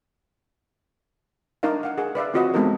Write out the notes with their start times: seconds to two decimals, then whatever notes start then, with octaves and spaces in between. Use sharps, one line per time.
1.63 D4 D#4 A#4 D5 F5
1.83 F5 F#5
1.98 G#4 A#4 F#5
2.15 B4 D5 E5 F5
2.34 C4 F4 F#4 B4 D#5 F#5
2.54 G#3 B3 C4 D#4 A4 A#4